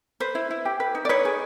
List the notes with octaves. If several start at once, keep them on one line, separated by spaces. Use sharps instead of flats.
B4 C5
E4
E4
G4
B4
D#4
D5
D#4 B4 C#5
G#4